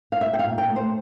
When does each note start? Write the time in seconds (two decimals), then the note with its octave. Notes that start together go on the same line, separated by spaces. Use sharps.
0.12 F5
0.21 A#2 E5
0.33 G5
0.39 F5
0.46 A#2
0.58 G5
0.70 A3
0.76 C5